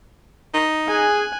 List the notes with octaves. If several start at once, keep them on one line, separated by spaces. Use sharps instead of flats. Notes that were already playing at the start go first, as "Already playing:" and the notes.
D#4
G#4 G#5 F#6